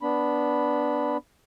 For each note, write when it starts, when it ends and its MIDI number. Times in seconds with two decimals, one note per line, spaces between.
0.02 1.17 59
0.02 1.17 62
0.02 1.17 83